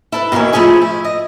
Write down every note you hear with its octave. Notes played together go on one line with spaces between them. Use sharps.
E4 A4 B4
B2 D#3 E3 A#3 C#4
F3 A3 C#4 E4 G#4 E5
E4
D#5